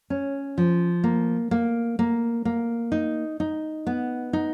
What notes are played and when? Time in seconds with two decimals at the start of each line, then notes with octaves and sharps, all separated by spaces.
0.10 C#4
0.58 F3
1.04 A#3
1.51 A#3
1.99 A#3
2.45 A#3
2.92 D#4
3.40 D#4
3.87 B3
4.33 D#4